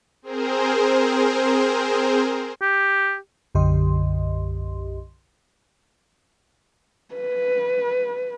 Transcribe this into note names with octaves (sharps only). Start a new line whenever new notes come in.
C4 G#4 A#4 C5
G4
B1 F#2 D3 G4 D#5 C6
B4